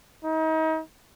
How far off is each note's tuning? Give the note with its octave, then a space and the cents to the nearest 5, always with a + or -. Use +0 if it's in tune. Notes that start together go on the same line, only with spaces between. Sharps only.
D#4 +35